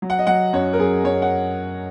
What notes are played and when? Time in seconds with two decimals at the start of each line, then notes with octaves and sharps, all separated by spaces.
0.02 F#3
0.10 F#5
0.19 D#5
0.27 F#3 F#5
0.53 F#2 C#5
0.73 A#4
0.79 F#2 G#4
1.04 F#2 C#5
1.22 F#5